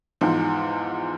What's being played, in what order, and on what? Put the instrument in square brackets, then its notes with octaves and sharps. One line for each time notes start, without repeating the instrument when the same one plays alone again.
[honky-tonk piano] E2 G#2 F3